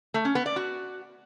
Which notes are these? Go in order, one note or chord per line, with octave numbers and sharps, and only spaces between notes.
A3
C#4
B3
D5
F#4